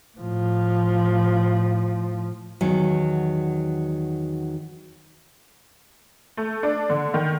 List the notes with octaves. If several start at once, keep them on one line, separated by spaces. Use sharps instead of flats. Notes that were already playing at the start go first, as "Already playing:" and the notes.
A2 F3
E2 D#3 F#3
A3
D4
D3
D#3